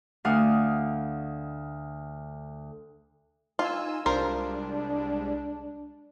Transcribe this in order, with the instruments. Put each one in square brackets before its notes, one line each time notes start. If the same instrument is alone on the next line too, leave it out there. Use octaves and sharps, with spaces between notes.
[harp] D2 F5 F#5 D#6
[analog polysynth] D#4 G#5 E6 [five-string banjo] F4
[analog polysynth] C2 G3 G#3 [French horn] D4 [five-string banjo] F4 A#4 C5